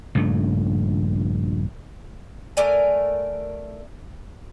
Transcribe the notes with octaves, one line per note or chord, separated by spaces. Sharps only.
A#1 G2 C#3 A3
A3 A#4 D5 G#5